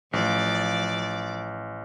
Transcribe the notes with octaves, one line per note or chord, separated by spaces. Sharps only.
A1 F3 D5